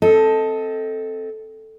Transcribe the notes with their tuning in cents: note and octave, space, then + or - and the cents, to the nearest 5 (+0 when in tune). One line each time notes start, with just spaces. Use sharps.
C4 +0 A4 +0 D#5 +20